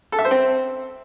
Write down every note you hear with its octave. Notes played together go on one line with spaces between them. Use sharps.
A4
E5
C5
C4